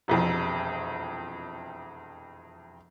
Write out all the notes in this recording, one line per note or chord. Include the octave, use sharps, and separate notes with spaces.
E1 C2 F2